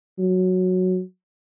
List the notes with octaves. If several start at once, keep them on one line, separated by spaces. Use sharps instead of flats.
F#3